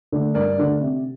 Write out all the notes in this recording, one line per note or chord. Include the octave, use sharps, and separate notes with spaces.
D3 A3 D4
G2 A#4 D5
D3 A3 D4
C3